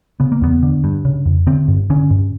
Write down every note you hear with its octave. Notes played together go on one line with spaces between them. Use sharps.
C#3 B3
A#3
E2 B3
D3
G2
C#3
F2
D3 C4
G2
D3 C#4
G2